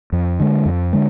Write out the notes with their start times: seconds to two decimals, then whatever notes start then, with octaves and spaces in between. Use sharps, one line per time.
0.12 F2
0.40 D3 G#3
0.66 F2
0.93 D3 G#3